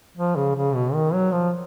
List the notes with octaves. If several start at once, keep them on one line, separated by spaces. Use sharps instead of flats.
F3
C#3
C#3
B2
D#3
F#3
F3